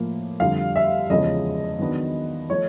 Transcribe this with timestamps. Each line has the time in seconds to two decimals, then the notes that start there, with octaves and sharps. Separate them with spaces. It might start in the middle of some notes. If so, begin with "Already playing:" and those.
Already playing: A2 F3 A#3
0.40 F2 D3 G3 F5
0.76 E5
1.10 E2 C#3 F3 G#3 D#5
1.79 D#3 F#3 B3 D4
2.50 F3 A3 C#5